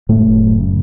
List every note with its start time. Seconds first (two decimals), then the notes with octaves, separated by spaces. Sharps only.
0.09 F#1 A2 A3
0.26 F#1
0.42 F#2
0.58 C#3